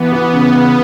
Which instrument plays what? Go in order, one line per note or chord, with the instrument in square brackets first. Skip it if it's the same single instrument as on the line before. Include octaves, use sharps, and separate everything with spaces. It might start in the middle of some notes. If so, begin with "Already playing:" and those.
Already playing: [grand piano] E3 [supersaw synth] B3
[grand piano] E3
C#3
C#3